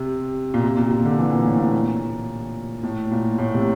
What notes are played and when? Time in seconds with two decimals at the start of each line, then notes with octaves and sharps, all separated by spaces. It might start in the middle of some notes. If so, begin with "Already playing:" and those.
Already playing: C3
0.54 A#2
0.63 C3
0.77 A#2
0.91 A#2
1.05 D3
1.18 E3
1.32 A#2
1.46 A2
1.59 A#2
2.83 A2
3.11 A#2
3.38 A2
3.54 C3